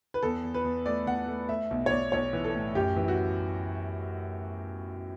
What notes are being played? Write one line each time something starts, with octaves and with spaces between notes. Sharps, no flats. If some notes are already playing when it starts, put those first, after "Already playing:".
B4
E2 A4
E2
B4
E2
A3 D5
E2 F#5
A3
A3 E5
B1
C#5
B1 D5
B1 C#5
E3
A4
A2
F#2 G4
E3
F#4